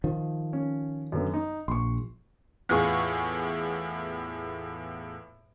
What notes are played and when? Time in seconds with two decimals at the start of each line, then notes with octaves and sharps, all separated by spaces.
0.04 D#3 F3
0.53 C#4
1.12 F#2 D3 B3
1.34 D#4
1.68 A#1 C6 C#6
2.69 E2 A2 F4 G#4 C#6